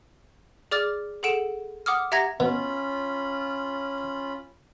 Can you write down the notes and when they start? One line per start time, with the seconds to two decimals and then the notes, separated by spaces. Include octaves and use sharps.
0.71 G#4 D5 D6 F6 A6
1.23 G#4 A4 F#5 D7 E7
1.86 F#5 D6 D#6 F6
2.12 G4 E5 F#5 A#5 G#6 A#6
2.40 B2 C#4 F4 B5